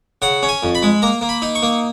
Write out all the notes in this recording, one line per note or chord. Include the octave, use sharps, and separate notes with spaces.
C#3 F#5
C#4
G#5
F2
B5
G#3
A#3 A#5
A#3
B5
D#4
C#6
A#3